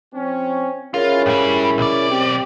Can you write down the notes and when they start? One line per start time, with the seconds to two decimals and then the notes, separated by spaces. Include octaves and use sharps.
0.14 F3 C4 C#4
0.94 C#4 E4 F4 G#4 A#4 C#5
1.26 G2 G3
1.78 B1 D5
2.09 C4 G4